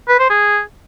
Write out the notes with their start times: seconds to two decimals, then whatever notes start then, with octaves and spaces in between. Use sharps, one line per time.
0.08 B4
0.19 C5
0.30 G#4